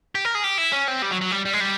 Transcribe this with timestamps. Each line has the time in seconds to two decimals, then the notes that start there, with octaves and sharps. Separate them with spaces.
0.15 G4
0.25 A#4
0.35 G#4
0.44 G4
0.58 E4
0.72 C#4
0.88 C4
1.02 G3
1.11 F#3
1.21 F#3
1.31 G3
1.45 G3
1.53 G#3
1.60 G3